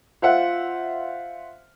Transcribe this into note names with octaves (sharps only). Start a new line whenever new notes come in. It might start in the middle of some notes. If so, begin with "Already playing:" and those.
F4 C5 E5 F#5